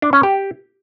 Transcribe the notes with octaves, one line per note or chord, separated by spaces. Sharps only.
D4
C#4
G4